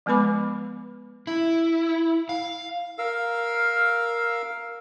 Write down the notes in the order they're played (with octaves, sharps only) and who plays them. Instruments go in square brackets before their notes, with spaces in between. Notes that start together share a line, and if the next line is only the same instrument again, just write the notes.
[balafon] F3 G#3 B3 B4 B5 D6
[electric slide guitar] E4
F5
[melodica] A#4 F5 E6